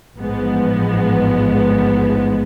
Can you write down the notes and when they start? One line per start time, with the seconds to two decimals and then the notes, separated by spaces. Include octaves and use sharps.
0.18 A1 G#2 F3 G#3 B3